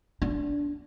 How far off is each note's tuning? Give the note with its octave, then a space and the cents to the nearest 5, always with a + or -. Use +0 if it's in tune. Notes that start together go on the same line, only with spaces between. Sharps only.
D4 -15